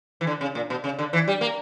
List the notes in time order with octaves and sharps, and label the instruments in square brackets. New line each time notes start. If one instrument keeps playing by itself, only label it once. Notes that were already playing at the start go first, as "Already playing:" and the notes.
[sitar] E3
D3
C#3
A#2
B2
C#3
D3
E3
G3
A#3